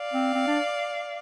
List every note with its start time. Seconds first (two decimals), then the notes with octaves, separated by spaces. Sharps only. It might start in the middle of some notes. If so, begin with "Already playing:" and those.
Already playing: D5 F5
0.13 C4
0.34 C4
0.47 D4